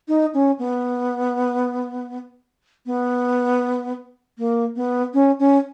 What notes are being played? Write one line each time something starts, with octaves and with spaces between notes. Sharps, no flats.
D#4
C#4
B3
B3
A#3
B3
C#4
C#4